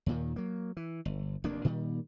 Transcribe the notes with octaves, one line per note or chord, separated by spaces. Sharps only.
D#2 A#2 D#3
F#3 A#3
E3
G1
F1 D#2 A#3 D4
A#2 D#3 G3